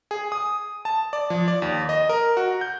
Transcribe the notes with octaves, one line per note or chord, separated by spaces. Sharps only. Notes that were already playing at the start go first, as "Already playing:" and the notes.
G#4
D#6
A5
D5
F3
D5
D#2
D#5
A#4
F#4
G6